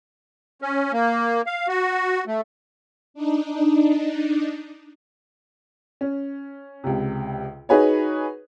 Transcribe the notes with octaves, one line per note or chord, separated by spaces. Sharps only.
C#4
A#3
F5
F#4
A3
D4 D#4
C#4
C#2 C3
D#4 F#4 G#4 B4 C#5